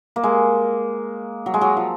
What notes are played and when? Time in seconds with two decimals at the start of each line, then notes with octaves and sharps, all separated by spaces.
0.16 A#3
0.24 G#3
1.46 F#3
1.54 G#3
1.61 F#3
1.77 F3